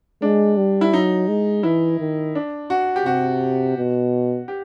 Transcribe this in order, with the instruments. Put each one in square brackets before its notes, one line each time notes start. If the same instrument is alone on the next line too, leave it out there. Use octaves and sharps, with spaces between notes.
[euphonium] G#3 [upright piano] D4
[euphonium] G3
[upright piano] E4
[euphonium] F#3 [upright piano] D#4
[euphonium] G#3
[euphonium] E3 [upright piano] E4
[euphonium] D#3
[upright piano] D4
F#4
G4
[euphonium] C3 [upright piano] F#4
[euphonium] B2
[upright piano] G4